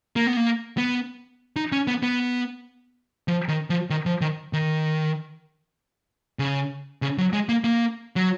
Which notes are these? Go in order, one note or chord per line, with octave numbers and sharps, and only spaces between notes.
A#3
B3
A#3
B3
D#4
C#4
B3
B3
F3
D#3
F3
D#3
F3
D#3
D#3
C#3
C#3
F#3
G#3
A#3
A#3
F#3